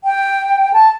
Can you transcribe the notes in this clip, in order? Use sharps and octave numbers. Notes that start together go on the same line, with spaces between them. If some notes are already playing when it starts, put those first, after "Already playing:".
G5
A5